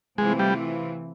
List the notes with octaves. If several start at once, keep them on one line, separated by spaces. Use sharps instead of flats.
C3 E3 G#3 A3 C4 F4
G3